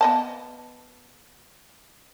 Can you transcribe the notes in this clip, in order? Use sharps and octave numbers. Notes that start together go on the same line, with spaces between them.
B3 D#5 A5